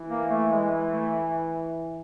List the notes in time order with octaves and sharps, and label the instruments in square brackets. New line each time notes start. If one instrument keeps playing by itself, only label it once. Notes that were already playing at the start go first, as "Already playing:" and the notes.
Already playing: [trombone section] E3
[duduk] A#3
A3
G#3
A3